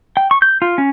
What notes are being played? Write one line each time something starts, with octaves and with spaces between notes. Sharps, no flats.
G5
C#6
G6
F4
C#4